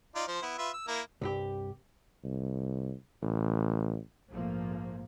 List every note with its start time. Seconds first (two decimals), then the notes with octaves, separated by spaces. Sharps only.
0.15 D#4 F4 D5
0.28 F3 C5
0.42 B3 E4
0.58 F4 B4 E5
0.74 E6
0.88 A#3 E4 A#5
1.22 C2 G2 G4
2.24 C2
3.22 A1
4.30 A#1 G#2 F3 A3 A#3